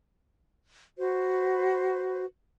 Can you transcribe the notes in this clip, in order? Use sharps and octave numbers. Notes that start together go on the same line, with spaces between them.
F#4 B4 C5